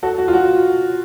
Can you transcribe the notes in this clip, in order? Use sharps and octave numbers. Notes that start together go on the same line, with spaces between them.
F#4 A4
F#4
F4
F#4